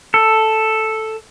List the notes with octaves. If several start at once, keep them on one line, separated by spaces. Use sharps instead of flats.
A4